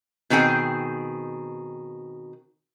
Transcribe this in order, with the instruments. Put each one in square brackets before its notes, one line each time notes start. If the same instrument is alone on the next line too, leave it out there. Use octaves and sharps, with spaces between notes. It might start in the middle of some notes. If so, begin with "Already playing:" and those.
[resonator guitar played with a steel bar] B2 D#3 C4 G#4 G5